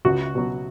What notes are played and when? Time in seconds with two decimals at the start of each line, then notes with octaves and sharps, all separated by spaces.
0.05 C#2 F#4
0.35 B2 F#3